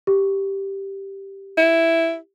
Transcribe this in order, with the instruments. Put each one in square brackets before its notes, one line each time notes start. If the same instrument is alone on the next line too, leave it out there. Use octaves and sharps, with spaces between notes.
[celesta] G4
[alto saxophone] E4